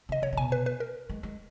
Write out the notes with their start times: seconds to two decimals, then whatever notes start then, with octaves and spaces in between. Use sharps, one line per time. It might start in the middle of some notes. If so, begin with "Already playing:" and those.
0.09 C#3 D#5
0.22 C#3 C#5
0.33 C#3
0.37 B2 G#5
0.52 B4
0.66 B4
0.80 A#4
1.09 G#3
1.23 G#3